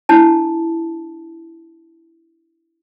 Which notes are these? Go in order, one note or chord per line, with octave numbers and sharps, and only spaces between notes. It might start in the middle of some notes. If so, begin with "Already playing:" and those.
D4 E4 A5